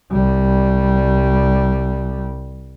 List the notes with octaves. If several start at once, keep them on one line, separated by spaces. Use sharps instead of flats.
C2 G3